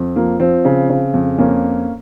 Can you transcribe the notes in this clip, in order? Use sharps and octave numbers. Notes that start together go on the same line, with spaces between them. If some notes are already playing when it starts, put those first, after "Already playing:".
Already playing: F2
F3 A#3
F3 C4
C#3
C#3
F2
F2 A#3 C#4